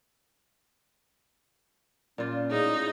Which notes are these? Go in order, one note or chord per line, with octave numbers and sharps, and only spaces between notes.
A#2 C#4 F4
A2 D#4 G#4